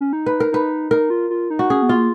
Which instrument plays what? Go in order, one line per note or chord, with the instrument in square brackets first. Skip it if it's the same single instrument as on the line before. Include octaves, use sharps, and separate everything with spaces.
[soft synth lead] C#4
D#4
[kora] B4
A#4
[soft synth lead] D#4 [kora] B4
[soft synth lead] D#4 [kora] A#4
[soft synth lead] F4
F4
D#4
[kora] F#4
[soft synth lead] C#4 [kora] G#4
[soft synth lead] B3
[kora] F4
[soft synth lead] A#3